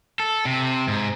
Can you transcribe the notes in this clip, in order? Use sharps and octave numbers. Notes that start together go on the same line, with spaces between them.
A4
C3
G#2